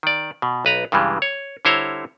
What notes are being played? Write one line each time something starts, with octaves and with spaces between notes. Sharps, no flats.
D#3 D5
B2
B1 B4 A#5
G2 C#3 E3 G3 G#3
C#5
D3 G3 E4 C5 C#5 A#5